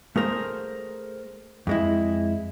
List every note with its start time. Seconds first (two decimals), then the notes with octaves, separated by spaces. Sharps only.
0.16 A3 G#4 A#4 C5
1.67 F2 G#3 E4